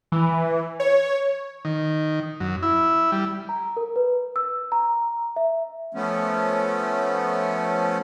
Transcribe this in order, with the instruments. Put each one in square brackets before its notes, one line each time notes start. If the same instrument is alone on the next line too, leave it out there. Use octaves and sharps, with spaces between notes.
[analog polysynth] E3
C#5
[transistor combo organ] D#3
F#2
E4
G3
[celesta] A#5
A#4
B4
E6
A#5
E5
[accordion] F3 A3 B3 C#4